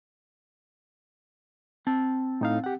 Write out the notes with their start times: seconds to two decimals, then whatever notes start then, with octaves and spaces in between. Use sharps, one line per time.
1.87 C4 A5
2.41 A2 D#4 F5
2.64 G4 F#5